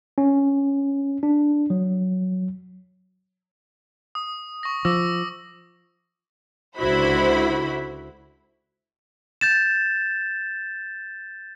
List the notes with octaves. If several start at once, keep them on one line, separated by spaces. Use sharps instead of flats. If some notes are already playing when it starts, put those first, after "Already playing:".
C#4
D4
F#3
D#6
C#6 A#6
F3 D6 E6 A#6
C#2 D3 E4 F#4 C5 B5
G6 A6 E7